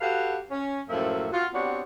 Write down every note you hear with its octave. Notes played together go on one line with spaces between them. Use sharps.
F#4 G4 A4 B4 F5
C#4
F#2 A2 F3 A#3 A4 E5
F4 F#4
B3 C4 D4 F#4 G4 C#5